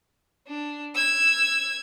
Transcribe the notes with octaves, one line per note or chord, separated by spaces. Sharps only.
D4
E6 G#6